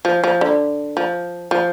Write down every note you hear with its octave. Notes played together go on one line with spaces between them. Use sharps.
F3
F3
D3
F3
F3